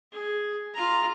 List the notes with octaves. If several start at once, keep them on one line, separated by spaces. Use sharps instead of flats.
G#4
F4 A#5